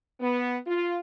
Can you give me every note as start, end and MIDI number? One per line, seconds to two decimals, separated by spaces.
0.21 0.56 59
0.67 0.99 65